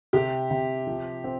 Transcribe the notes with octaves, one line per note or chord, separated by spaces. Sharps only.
C3 G4
C3
F3
C4